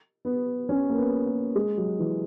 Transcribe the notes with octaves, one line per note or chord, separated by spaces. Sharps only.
B3
C#4
A#3
B3
A#3
G#3
F#3
E3